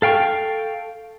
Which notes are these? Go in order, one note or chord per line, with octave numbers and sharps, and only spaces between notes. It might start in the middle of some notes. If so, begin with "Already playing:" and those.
A4 F5 G5 C#6